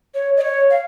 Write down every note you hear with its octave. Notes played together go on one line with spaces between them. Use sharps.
C#5
D#5
C#5
F5